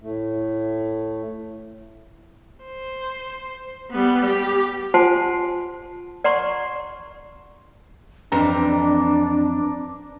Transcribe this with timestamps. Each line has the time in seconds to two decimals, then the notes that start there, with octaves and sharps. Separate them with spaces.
0.02 A2 A3
2.65 C5
3.91 G3 B3
4.26 G4
4.94 F4 C5 F#5 G#5 A5 C6
6.24 D5 F#5 A#5 C6 C#6
8.32 F2 E3 C4 D4 A#5